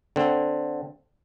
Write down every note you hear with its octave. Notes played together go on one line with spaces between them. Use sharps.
D3 C4